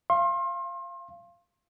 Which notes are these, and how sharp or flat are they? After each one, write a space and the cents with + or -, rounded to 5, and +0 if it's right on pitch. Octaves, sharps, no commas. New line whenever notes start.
F5 -25 C6 +35